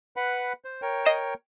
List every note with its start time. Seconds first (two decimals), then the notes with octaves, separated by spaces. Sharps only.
0.16 B4 F#5 B5
0.65 C5
0.82 A#4 C#5 G5
1.05 D#5 C7 E7